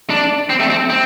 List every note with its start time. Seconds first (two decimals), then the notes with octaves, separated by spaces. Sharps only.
0.10 D4
0.50 C4
0.60 A3
0.70 C4
0.90 C4